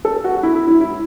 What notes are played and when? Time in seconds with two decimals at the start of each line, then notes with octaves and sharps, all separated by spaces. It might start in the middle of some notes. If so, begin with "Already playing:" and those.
0.05 A4
0.24 F#4
0.43 E4
0.55 E4
0.67 E4
0.81 E4